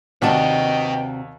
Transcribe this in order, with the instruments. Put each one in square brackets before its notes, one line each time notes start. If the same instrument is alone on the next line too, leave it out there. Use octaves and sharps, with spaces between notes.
[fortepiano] D#2 A5 [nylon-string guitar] C3 D4 F#4 [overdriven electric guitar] B4 D#5 [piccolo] G5